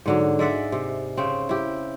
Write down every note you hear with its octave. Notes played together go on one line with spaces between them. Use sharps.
G#2 D3 F#3
G#3 D5 E5 F#5
C3
C#3 C4
E4 G4